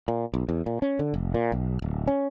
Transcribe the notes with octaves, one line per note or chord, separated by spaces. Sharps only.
A#2
B1
E2
A#2
C#4
D3
F1
A#2
B1
D1
C#4